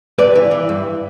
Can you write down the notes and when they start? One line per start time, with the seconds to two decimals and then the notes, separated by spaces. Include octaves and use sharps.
0.18 G2 B4 D5
0.36 E3
0.51 E3
0.69 G2